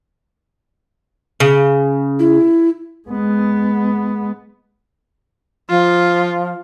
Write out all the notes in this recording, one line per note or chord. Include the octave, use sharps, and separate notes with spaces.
C#3
E4
G#3 B3
F3 F4